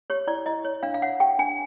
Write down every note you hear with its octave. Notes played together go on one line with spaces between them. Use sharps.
G4 C#5
E4 D5
E4 D#5
C#5
D4 F5
F5
C#5 F#5
G4 G5
D4 G#5